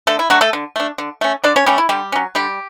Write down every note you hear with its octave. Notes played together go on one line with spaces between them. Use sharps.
D3 A3 A4
E4
F#3 A3 D4 F#4
A3 A4
D3
A3 D4
D3
A3 C#4
D3 D4 D5
C#4 C#5
G3 A3 C#4 G4
E4
D3 G3 G4
F#3 C#4
D3 G3 G4